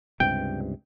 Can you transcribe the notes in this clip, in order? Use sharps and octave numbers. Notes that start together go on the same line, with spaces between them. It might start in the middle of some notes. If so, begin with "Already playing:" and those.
C#2 G2 C3 G5